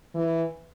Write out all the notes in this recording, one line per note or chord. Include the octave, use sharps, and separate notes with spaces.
E3